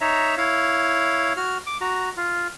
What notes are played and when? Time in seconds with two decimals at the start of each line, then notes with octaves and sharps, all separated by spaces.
0.01 D#4 C#5 E5 A#5
0.38 E4 C#5 F5
1.37 F#4 F6
1.67 D6
1.81 F#4 A#5
2.17 F4